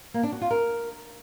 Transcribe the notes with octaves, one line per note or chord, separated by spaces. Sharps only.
A#3
D4
F#4
F4
A#4